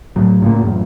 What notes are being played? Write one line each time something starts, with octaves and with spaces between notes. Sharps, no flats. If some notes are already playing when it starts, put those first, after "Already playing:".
A2 F#3
A2 C#3 A#3
A1 F#2